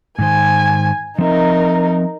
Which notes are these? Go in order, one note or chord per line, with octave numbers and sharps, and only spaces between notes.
G#2 D#3 C5 G#5
F3 C4 D#4 A#4 E5